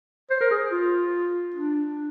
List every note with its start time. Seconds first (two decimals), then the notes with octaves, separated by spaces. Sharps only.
0.30 C5
0.41 A#4
0.51 G#4
0.72 F4
1.55 D4